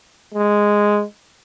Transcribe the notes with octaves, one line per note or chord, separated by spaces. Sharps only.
G#3